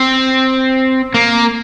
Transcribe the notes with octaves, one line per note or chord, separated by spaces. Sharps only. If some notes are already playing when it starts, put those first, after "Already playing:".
Already playing: C4
A#3